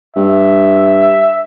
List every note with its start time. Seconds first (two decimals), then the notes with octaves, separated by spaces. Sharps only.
0.16 G2 E5